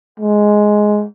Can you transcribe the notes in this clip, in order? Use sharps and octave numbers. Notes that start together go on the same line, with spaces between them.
G#3